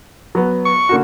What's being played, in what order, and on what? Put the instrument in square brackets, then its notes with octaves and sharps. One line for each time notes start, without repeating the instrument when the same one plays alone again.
[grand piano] F#3 B3
[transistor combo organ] C#6
[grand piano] D3 A#3 F#4